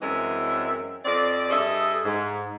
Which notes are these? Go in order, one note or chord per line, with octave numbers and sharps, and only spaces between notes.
F#2 E3 G#3 C4 E5
F2 C4 D5
G2 G#4 A4 D#5 E5
G#2